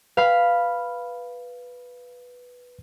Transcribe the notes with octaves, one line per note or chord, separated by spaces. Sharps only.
B4 F5 B5 F6